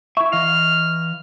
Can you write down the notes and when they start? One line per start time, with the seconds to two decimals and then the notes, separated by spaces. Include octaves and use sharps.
0.17 E4 E5 C#6
0.32 E3 D#5 F5 F6